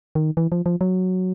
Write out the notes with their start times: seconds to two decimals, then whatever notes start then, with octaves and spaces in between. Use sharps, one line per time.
0.15 D#3
0.37 E3
0.52 F3
0.66 F3
0.81 F#3